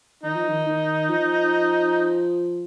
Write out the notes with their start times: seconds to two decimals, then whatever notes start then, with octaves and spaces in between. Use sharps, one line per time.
0.23 D#3 D#4
0.36 F3
0.48 D#3
0.66 D#3
1.09 F3